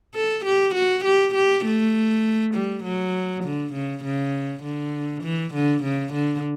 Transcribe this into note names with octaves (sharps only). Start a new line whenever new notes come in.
A4
G4
F#4
G4
G4
A3
G3
F#3
D3
C#3
C#3
D3
E3
D3
C#3
D3